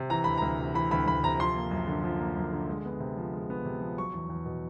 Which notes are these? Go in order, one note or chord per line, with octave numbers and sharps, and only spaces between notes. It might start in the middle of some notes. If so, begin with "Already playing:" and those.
Already playing: C3
E3 A#5
D2 B5
D2 A#5
C3
E3 B5
D2 B5
D2 B5
C3 A#5
F3 C6
A#3
F#2
D3
F3
A#3
F#2
D3
G#3
B3
C3
F3
G#3
B3
C3
F3
F#3 C#6
E2
E2
B2